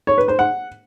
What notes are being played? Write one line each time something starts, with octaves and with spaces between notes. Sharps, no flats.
C#5
B4
C5
F#5